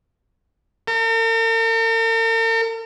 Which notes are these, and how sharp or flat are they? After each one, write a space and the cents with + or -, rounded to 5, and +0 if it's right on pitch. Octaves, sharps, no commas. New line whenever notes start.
A#4 -45